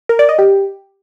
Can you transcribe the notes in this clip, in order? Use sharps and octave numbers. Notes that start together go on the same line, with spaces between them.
A#4
D5
D#5
G4